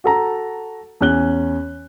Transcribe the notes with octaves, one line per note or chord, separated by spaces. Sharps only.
F#4 A4 A#5
E2 C#4 F#6 G7